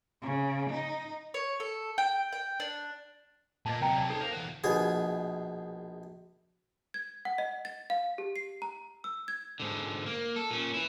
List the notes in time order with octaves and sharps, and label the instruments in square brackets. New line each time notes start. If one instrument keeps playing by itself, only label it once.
[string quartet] C#3
D#4
[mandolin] C#5
A4
G5
G5
D4
[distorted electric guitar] A#2 A#3 [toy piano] D#5 A5
[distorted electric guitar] C3 F#3 [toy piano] C#5 G5 A#5
[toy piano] D5 A5
[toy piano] D#4 A4 [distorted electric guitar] C5 C#5
[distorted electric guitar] A#4 F5 [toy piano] C5 C#5
[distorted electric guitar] E3 F#4
[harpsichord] A#1 B2 G#4
[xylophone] G#6
F#5
D#5
A6
F5
G4
C7
A#5
E6
G#6
[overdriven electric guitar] G#2 D3
A#3
A4
A#2 C#4
E3 E4